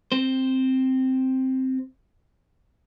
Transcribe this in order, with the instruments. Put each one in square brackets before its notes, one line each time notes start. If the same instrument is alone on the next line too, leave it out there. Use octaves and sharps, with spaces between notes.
[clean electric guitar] C4 C5